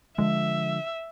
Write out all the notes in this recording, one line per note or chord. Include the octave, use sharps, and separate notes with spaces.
D3 F3 G#3 E5